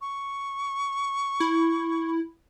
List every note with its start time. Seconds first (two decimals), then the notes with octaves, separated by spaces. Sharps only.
0.01 C#6
1.40 E4